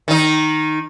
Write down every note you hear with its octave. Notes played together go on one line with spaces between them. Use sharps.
D#3 D#4